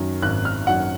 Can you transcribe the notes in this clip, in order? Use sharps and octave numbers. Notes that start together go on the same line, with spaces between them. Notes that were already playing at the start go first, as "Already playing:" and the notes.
Already playing: F#2 D#3 F#3
G#1 F#6
F6
F#2 D#3 F#3 F#5